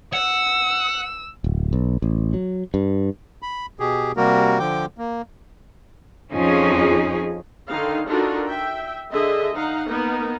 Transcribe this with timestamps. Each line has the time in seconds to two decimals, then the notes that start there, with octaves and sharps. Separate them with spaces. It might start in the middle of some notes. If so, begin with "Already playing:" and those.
0.13 F#5 E6
1.44 D1
1.73 B1
2.02 A1
2.34 F#3
2.74 G2
3.42 B5
3.80 B2 G4 G#4
4.17 C3 G3 A#3 F#4 A#4
4.59 D3 F3 G5 D6
4.98 A#3
6.32 F2 F3 C#4 D#4 G#4
7.68 D3 D#3 D#4 F5
8.08 D4 D#4 F4 F#4 A4 A#4
8.48 E5 G5
9.12 D3 G#4 D#5 E5
9.54 D#4 F5 F#5
9.88 A#3 B3 D#4 A#4